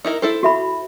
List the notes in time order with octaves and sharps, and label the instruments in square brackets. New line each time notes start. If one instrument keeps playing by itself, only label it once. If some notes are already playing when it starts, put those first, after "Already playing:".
[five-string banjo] D#4 E4 A#4
E4 A4 C5
[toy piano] F#4 E5 B5